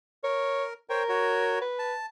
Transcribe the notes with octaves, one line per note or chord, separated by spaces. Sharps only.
A#4 C#5
A#4 C5 C#5 G5
F#4 C#5
B4
A5